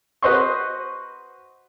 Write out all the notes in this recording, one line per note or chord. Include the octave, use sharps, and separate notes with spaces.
F#4 B4 C5 D#5 C6 C#6